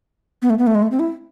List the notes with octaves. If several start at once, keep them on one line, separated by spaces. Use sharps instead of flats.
B3
A3
B3
A3
G#3
A3
C4
E4